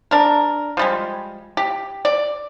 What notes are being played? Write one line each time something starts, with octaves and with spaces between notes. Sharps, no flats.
D4 A#4
F3 G3 G#3
G4
D5